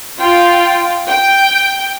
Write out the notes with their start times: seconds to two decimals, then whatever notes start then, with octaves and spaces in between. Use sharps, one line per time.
0.18 F4 G5
1.07 G5